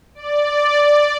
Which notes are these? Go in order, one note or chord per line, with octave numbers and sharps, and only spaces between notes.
D5